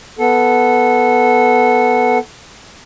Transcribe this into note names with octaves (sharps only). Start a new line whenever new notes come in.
B3 A4